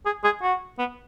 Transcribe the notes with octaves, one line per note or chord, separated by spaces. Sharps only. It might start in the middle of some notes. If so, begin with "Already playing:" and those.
G#4
G#4
F#4
B3